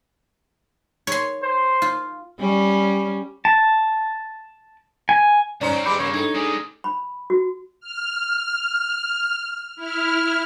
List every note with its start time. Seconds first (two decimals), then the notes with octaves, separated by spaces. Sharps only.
1.07 C#5 C6
1.43 C5
1.82 F4
2.40 G3 C#4
3.45 A5
5.09 G#5
5.61 C#2 G2 C#4 D#4 C5 D5 A#5
5.73 G2 C4
5.85 E3 G3 G#3 B5 D6 G6 C#7
5.99 C#3 A#3 C#5
6.14 D4 D#4 A4
6.35 G3 G#3 G#4
6.84 B5
7.30 F#4
7.80 F6
9.76 E4 F6